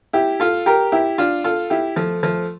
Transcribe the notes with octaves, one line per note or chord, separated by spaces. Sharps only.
E4 G4
F4 A4
G4 A#4
E4 G4
D4 F4
F4 A4
E4 G4
F3 A3
F3 A3